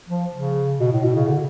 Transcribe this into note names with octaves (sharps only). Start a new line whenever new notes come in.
F3
C#3
B2
A2
B2
C#3
D3